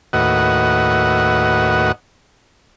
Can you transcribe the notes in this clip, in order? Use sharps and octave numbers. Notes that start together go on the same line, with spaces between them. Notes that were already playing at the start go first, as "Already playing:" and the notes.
D#2 A2 F#4 B4 D#5 F#5